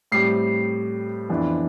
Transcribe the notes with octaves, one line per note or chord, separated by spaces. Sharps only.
A2 G3 C4 C7
F2 E3 B3 D4